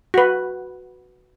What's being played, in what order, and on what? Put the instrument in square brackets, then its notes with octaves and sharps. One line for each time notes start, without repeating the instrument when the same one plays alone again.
[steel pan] F#4 B4